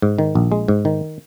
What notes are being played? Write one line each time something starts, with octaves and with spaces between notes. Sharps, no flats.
G#2
D#3
A#1
G#3
G#2
D#3